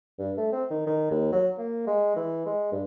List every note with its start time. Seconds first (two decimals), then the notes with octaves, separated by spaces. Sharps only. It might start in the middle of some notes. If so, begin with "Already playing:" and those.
0.19 G2
0.37 A3
0.52 C4
0.71 D#3
0.87 D#3
1.11 D#2
1.33 F#3
1.58 A#3
1.87 G#3
2.16 E3
2.46 G#3
2.72 G2